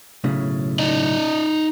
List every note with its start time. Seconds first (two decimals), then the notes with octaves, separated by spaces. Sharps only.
0.24 B1 A2 C#3
0.79 D#4 D5 D#5